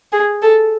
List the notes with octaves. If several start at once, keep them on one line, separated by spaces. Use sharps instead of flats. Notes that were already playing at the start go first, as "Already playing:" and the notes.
G#4
A4